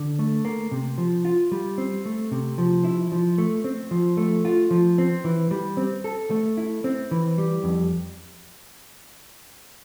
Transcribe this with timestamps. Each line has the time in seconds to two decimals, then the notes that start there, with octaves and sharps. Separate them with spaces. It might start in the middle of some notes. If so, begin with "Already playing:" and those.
Already playing: D3
0.19 A3
0.45 A#3
0.71 C3
0.98 F3
1.25 F4
1.52 G3
1.78 C4
2.05 A3
2.31 C3
2.58 F3
2.84 E4
3.12 F3
3.38 A3
3.64 C4
3.91 F3
4.17 A3
4.45 F4
4.71 F3
4.98 C4
5.24 E3
5.51 G3
5.77 C4
6.04 A4
6.31 A3
6.57 E4
6.84 C4
7.11 E3
7.38 G3
7.64 F2